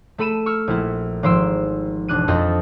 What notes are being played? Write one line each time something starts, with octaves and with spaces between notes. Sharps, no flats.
A3 A4 B5 D#7 E7
C#6 E6 F6
A#1 E4
G#1 F3 C5 C6 E6 D7
E1 D4 F#6 D#7
F2 C4 A4 D#5 G6 A6